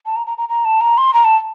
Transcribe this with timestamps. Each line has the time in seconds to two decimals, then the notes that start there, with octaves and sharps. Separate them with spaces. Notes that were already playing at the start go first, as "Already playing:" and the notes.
0.06 A5
0.16 A#5
0.27 A#5
0.38 A#5
0.49 A#5
0.65 A5
0.81 A#5
0.98 C6
1.14 A#5
1.25 A5